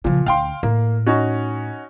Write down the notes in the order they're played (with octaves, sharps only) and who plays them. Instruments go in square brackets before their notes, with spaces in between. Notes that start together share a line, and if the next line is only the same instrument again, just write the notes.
[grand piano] A#2 [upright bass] C#3 F3
[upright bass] D2 [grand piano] F5 G5 C6
[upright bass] A2 [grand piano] A#3
[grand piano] C#4 D#4 F#4